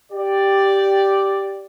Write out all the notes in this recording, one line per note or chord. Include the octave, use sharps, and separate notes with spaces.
G4 D5